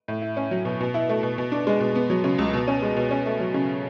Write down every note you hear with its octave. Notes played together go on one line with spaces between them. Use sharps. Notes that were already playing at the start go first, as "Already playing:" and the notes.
A2
E4
C#4
F#3
B2
B2
E4
A3
B2
B2
D4
G#3
B2
B3
F#3
C#3
C#2
B2
C#4
G#3
B2
C#4
A3
F#3
C#3